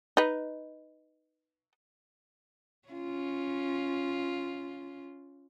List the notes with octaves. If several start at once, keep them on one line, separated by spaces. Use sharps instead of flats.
D#4 B4
C#4 F4